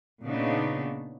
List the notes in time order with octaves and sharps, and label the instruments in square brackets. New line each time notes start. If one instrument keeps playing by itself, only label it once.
[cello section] A#2 C#3 B3 D4 D#4